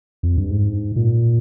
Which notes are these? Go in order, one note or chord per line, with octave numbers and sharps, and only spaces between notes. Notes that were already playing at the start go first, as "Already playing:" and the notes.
F2
G2
G#2
A#2